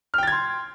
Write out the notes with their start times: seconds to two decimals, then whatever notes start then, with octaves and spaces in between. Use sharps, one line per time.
0.14 F6
0.18 G5
0.23 A6
0.27 G#6
0.32 C6